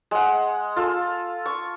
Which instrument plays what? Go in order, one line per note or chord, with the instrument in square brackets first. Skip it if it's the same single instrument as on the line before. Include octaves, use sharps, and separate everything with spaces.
[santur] G#3 F#5
F4 A4
C#6